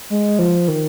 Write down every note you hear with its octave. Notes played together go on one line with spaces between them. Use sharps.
G#3
F3
D#3